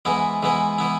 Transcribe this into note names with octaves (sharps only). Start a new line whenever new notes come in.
G#2 E3 B3 E4
G#2 E3 B3 E4
E3 B3 E4